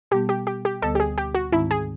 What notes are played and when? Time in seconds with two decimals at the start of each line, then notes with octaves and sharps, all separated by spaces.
0.11 B2 G3 B3 G4
0.29 G4
0.47 G4
0.65 G4
0.82 D2 D3 G3 B3 A4
0.95 G4
1.00 G#4
1.18 G4
1.35 F#4
1.52 G#2 D#3 G#3 C4 D#4 E4
1.71 G#4